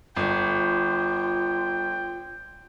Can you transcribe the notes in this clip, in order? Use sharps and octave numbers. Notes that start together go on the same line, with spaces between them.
G1 F4 G5